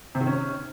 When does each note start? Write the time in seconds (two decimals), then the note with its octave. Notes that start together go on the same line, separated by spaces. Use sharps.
0.15 C3
0.21 D#3
0.27 C#4